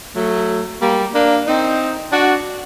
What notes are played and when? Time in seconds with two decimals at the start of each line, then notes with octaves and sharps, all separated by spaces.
0.16 F#3 A3
0.82 G3 A#3
1.15 A#3 D4
1.47 C4 D#4
2.13 D4 F#4